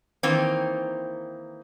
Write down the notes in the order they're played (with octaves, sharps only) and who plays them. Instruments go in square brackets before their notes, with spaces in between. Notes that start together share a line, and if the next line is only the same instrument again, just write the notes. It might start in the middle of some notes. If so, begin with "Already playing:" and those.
[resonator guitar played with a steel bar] D#3 E3 A#3 C4